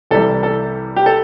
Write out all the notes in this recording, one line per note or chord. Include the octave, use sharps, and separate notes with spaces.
C2 C3 E3 G3 A4
A4
G4
A4